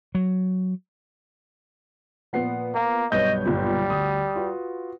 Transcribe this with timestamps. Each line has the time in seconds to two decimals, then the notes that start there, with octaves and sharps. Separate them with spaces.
0.15 F#3
2.33 A#2 F3 B3 F#5 C7
2.75 A#3 F5
3.12 B1 G2 B3 B4 C#5 D#5 G6
3.45 G1 A#2 G3
3.90 D2 D#6
4.36 F4 F#4 B4